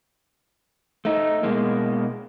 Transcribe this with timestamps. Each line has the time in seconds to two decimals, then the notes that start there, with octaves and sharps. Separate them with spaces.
1.05 A3 D#4
1.43 B2 G#3 A#3